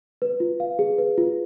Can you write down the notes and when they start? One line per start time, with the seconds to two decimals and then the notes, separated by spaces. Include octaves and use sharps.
0.22 B4
0.40 F4
0.60 F5
0.79 G#4
0.98 B4
1.17 F4